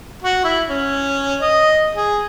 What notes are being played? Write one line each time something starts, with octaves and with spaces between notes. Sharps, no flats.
F#4
E4
C#4
D#5
G#4